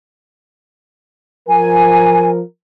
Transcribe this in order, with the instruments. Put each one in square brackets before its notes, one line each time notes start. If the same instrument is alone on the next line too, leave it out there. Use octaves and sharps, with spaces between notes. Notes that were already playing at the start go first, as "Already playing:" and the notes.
[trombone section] F3 A#4 [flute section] G#5